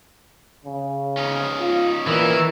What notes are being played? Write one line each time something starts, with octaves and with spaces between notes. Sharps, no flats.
C#3
C#4 D#4
F4
A#2 E3 A#4 E6